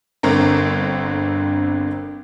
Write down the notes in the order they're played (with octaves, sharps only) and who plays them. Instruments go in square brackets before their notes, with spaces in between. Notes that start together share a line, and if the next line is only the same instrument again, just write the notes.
[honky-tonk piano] G1 D3 C4 A#4